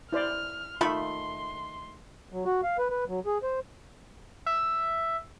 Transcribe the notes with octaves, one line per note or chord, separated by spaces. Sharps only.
E4 C5 D5 F6
D#3 A3 F4 E5 B5 C6
F#3
F#4
F5
B4
B4
F#3
G#4
C5
E5